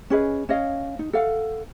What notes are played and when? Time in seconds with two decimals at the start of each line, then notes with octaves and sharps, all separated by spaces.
0.10 C#4 G#4 B4 D#5
0.49 C#4 C#5 D#5 F5
0.99 D#4
1.13 A4 F5 F#5